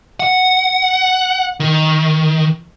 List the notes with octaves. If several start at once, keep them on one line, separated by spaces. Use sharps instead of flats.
F#5
D#3